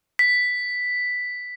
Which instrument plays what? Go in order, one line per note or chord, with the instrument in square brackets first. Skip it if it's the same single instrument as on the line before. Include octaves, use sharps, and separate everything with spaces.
[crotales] B6